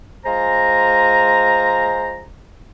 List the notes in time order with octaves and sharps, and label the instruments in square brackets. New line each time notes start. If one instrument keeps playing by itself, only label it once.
[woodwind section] G#3 F4 C5 G#5 A#5